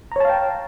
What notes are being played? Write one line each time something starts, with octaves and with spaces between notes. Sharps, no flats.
C#5 F5 G5 A5 A#5